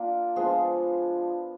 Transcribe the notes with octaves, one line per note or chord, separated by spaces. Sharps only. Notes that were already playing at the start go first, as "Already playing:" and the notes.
Already playing: A#3 D4 F4 A#4 D5
F3 G#3 B3 D4 G#4